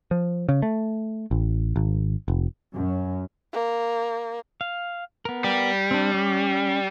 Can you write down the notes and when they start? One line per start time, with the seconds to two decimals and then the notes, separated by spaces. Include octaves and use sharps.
0.11 F3
0.49 C#3
0.62 A3
1.31 A1
1.76 G#1
2.28 F1
2.73 F#2
3.53 A#3
4.61 F5
5.25 B3 A#4
5.44 G3
5.91 C4 D4
6.12 C#4 D5